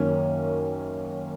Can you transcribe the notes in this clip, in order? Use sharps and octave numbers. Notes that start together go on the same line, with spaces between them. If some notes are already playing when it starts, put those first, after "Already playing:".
Already playing: F#2 D#3 A#3 C#4